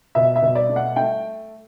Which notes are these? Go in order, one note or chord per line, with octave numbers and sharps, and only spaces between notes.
B2 E5
E5
B2
D5
A3
F#5
A3 G5